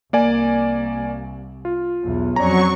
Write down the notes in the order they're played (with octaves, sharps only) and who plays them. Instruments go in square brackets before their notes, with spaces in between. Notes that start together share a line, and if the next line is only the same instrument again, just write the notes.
[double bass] C2 [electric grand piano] A#3 D5 G#5
[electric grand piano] F4
[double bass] B1 E2
[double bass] F2 C#4 [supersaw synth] F#3 C#6 [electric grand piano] D5 A#5